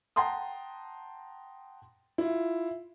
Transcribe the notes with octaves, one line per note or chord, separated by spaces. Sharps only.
F#5 G5 A5 A#5 C6 D#6
E4 F4